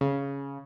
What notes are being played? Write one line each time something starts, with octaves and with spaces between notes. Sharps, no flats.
C#3